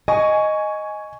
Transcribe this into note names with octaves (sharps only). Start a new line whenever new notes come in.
D#5 G#5 C#6